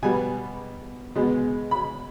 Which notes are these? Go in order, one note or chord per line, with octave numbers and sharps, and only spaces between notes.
B2 G3 B3 G#5
B2 G#3 B3
B5